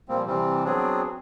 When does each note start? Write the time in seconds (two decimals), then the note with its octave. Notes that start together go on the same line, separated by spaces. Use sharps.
0.09 A#2 F3 G3 A#3 C4
0.27 C3 E3 G3 C4
0.65 F#3 B3 C4 D4 G#4